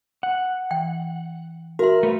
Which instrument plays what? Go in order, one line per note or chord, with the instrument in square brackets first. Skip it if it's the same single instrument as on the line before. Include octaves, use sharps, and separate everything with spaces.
[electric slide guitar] F#5
[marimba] E3 [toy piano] G5
[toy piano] F#4 C6 [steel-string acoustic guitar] A#4 E5
[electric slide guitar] A3 B4 F5